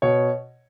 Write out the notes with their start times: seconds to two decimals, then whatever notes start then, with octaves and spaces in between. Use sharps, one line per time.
0.02 B2 C#5